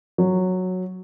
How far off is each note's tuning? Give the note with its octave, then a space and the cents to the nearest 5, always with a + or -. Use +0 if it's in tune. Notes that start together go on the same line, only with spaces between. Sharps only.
F#3 -5